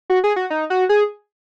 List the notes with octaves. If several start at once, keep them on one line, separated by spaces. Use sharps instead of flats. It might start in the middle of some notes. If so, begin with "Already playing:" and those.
F#4
G#4
F#4
D#4
F#4
G#4